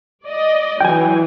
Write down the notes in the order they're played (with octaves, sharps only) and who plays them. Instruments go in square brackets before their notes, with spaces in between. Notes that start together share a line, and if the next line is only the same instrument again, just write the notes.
[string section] D5 D#5
[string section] E3 F#3 [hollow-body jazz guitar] G5 G#5